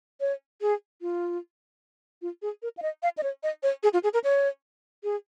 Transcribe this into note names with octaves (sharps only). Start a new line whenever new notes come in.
C#5
G#4
F4
F4
G#4
A#4
F5
D#5
F5
D#5
C#5
D#5
C#5
G#4
F4
G#4
A#4
C#5
G#4